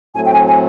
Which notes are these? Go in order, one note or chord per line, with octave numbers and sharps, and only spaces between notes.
A2 F#3 A3 C4 G#5
G5
G#5
G#5